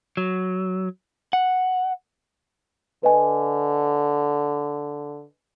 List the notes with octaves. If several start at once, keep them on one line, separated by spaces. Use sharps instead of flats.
F#3
F#5
D3 B4 D#5 G#5